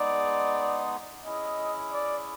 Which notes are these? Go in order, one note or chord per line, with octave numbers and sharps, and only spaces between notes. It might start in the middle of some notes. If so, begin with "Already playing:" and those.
Already playing: G#3 B3 D#4 G#4 D5
C#4 E4 G#4 D#5
D5